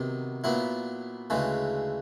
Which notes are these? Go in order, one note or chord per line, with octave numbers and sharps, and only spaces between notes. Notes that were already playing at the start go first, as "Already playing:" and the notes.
Already playing: C3 D#3 F#3 B3
A#2 F#3 B3 E4
D2 C#3 E3 G#3